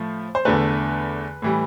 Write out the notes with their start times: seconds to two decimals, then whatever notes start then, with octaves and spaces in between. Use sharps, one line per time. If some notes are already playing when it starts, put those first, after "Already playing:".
Already playing: A2 F3 A3
0.35 C5
0.45 E2 D3 A3 B4
1.42 A2 E3 G3